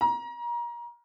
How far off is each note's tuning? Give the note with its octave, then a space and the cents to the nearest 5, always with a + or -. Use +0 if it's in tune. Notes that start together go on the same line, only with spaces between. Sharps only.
A#5 +30